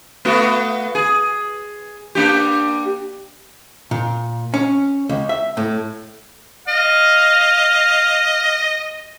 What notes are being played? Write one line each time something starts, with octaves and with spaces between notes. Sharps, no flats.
A3 B3 F#4
G#4
A#3 D4 G4
A#2
C#4
C#2
E5
A2
D#5 F5